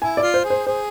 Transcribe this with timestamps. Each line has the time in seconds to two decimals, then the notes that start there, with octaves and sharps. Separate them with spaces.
0.02 E4 G#5
0.17 D5
0.23 F4
0.34 C5
0.45 G#4
0.50 C5
0.67 G#4 C5